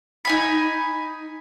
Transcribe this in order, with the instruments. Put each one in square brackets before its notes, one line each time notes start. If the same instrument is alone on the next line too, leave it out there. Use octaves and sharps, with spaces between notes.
[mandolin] D#4 G#5 B5